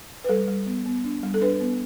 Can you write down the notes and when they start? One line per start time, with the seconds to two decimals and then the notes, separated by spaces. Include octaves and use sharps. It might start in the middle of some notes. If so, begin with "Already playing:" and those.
0.24 B4
0.29 G3 A4
0.48 G3
0.66 B3
0.85 B3
1.04 D4
1.23 G3
1.34 A4
1.41 D4 B4
1.60 B3